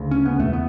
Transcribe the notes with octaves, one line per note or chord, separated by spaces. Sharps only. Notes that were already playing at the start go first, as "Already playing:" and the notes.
Already playing: D2 C#3
C#4
B3
E2 B2 A3
B3